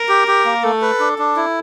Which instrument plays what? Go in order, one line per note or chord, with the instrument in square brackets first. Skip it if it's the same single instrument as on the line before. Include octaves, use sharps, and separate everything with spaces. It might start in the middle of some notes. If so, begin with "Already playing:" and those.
Already playing: [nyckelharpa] A#4
[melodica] G4
G4
A#3
[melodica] A3 [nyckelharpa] A4
[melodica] B4
D4
D4
E4